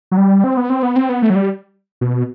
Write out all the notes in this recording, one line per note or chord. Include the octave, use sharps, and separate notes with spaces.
F#3
G3
C4
B3
C4
B3
C4
B3
A3
F#3
G3
B2